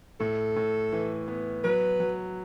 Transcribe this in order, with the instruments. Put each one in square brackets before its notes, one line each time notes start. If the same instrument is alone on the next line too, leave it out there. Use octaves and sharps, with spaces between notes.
[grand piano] A2 [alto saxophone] A4
[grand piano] A2
E3
B3
[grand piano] F#3 [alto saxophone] B4
[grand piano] F#3